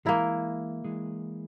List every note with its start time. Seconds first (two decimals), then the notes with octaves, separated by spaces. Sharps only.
0.05 E3 G#3 A#3 E4 A#4
0.84 E3 G#3